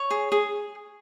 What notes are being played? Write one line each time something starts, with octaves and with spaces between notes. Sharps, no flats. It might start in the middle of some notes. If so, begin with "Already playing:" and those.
Already playing: C#5
G#4
G#4